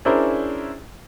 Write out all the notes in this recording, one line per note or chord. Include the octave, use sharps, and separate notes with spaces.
C#4 D4 E4 G#4 A#4 C5